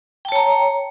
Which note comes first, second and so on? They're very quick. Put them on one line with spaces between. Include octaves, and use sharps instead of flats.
G5 A5 C#5 A#5